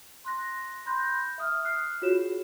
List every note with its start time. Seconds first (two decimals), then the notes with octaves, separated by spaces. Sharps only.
0.25 C6 F#6 A#6
0.86 B5 C6 F#6 G6 A#6
1.38 E5 D#6 F6
1.63 F6 F#6 C7
2.02 F4 F#4 G#4 C#5 E7